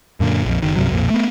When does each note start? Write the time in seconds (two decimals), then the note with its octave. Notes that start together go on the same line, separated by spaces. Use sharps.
0.20 F#2 A#2 D3
0.45 A#1 F2
0.62 F#1 D#3
0.76 C2 G2 C3 F#3
0.91 B1 F2 A#2
1.10 A3 B3